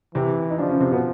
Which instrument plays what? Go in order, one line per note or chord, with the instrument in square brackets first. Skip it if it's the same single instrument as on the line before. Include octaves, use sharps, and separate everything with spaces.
[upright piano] C3 C4 [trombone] E3
[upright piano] D#4
[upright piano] D3 D4 [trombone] F3
[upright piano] C#3 C#4
C3 C4
B2 B3